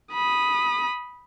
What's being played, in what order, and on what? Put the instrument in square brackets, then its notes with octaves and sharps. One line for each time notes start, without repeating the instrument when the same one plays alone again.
[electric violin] B5 D#6